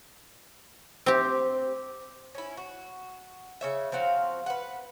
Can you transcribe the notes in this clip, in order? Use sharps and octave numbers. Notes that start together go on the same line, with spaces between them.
C4 G4
C#4 E4
F#4
C#3 C#5 E5
F3 C4 F#4 F5
B4 F#5